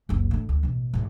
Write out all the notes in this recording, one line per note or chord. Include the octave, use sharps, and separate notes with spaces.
F#1 C#2
A2 D3
D2
A1 B2
A1 G#2